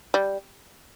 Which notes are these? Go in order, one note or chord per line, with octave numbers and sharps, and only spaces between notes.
G3